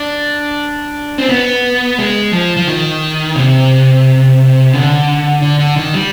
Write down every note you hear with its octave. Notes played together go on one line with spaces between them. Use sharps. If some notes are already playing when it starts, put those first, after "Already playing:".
Already playing: D4
C4
B3
G#3
F3
F3
D#3
C3
D3
D3
D3
D#3
G3